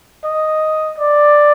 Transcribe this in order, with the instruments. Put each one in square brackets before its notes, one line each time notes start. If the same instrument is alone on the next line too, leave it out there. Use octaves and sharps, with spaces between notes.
[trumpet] D#5
D5